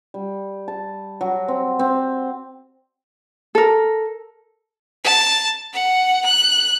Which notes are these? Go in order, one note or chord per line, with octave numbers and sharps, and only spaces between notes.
G3
A5
F#3
C4
C4
A4 A#4
A5
F#5
F#6